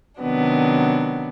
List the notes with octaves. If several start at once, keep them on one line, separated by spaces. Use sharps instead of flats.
C3 D#3 F#3 B3 D4